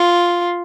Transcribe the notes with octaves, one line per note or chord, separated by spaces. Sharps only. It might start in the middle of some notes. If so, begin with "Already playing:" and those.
Already playing: F4